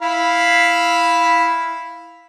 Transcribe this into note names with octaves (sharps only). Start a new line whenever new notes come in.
E4 F5 B5